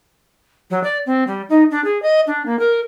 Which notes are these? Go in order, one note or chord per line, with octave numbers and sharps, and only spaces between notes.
F#3
D5
C4
G3
D#4
D4
G#4
D#5
D4
A#3
A#4